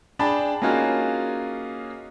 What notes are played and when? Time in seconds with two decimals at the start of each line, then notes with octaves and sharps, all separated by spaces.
0.19 D4 G#4 D5 G5 A5 B5
0.62 A#3 C#4 D#4 F4 F#4 G#4